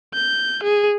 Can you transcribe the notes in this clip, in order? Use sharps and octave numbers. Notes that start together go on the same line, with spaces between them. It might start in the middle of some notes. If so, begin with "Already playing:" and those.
G6
G#4